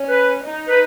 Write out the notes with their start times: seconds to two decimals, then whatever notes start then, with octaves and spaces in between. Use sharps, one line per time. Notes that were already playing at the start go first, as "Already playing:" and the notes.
Already playing: C#4
0.09 B4
0.44 D#4
0.69 B4